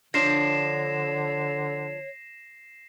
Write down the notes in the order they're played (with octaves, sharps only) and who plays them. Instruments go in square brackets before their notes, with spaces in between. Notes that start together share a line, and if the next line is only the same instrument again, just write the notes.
[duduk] D3 [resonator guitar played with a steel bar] F3 D4 [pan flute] C#5 [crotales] A#6 C7 E7